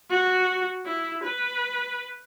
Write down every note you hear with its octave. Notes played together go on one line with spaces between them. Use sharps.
F#4
E4
B4